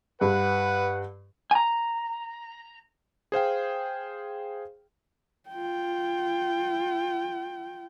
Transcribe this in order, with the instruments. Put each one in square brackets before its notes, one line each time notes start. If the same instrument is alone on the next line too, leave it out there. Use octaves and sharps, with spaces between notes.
[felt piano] G2 [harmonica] B4 [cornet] F#5
[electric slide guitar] G#5 A#5
[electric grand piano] G#4 C5 F5 G5
[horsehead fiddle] F4 G5